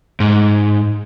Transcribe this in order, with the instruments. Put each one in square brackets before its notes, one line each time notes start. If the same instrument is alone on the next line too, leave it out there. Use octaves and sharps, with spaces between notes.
[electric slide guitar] G#2